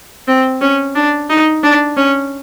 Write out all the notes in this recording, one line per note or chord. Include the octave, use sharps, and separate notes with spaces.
C4
C#4
D4
D#4
D4
C#4